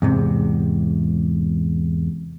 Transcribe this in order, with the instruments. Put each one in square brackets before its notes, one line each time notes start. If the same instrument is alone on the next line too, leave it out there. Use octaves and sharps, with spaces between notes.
[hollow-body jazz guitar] E2 G#2 C3